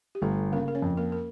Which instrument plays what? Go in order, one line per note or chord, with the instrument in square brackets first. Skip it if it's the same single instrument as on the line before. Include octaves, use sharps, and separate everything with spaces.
[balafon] G4
[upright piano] G1 [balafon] A3 A4
[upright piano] C#3 [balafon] A#3 A#4
[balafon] A#4
C#4 C#5
[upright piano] F2
[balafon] A#3 A#4
A#4